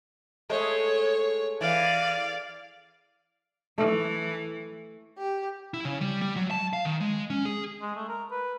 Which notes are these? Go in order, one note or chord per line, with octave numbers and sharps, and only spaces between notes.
G#3 A3 C#5
E3 D5 F5
E3 A3
G4
E4
C#3
G3
G3
F#3
A5
F5
D#3
G#3
C#4
G#4
G#3
A3
A#4
B4